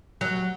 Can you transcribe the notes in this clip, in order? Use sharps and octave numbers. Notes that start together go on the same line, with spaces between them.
F#3